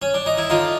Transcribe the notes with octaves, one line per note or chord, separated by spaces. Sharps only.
C#4
D4
D#4
E4
D3 D#4 F4